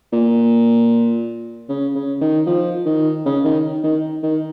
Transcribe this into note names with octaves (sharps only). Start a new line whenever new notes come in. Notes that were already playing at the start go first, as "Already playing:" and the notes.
A#2
C#3
C#3
D#3
F3
D#3
C#3
D#3
D#3
D#3